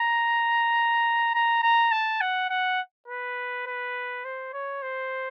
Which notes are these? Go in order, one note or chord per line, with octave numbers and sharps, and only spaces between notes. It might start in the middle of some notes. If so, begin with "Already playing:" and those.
Already playing: A#5
A#5
A#5
A5
F#5
F#5
B4
B4
C5
C#5
C5